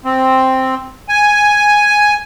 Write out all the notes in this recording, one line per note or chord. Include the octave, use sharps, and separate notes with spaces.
C4
G#5